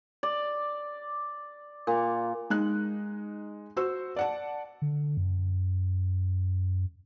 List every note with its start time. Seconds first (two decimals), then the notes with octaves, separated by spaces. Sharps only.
0.23 D5
1.87 A#2
2.50 G#3 D#4 F#6
3.76 F#4 C5 E6
4.16 D5 F#5 A5
4.82 D3
5.17 F#2